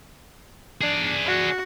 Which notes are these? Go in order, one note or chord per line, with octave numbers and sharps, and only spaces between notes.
D4 G#4 D5
F#4